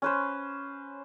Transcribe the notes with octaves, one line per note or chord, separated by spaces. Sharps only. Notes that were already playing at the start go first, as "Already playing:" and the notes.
C#4 B4 C5